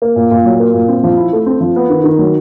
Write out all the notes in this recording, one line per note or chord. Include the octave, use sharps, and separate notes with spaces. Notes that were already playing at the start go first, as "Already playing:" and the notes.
A#3
A#2
A#2
F#3
A#3
A#2
C4
F3
E4
A3
C4
F3
B3
D#3
D#3
F#3